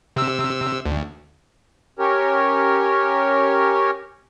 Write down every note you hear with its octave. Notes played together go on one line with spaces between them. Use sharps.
C3 E6
D2
C#4 G4 A#4 C#5